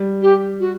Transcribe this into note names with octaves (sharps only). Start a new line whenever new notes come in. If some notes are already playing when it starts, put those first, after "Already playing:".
Already playing: G3
G4
F#4